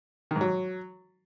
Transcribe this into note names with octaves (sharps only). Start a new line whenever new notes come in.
D#3
G#2
F#3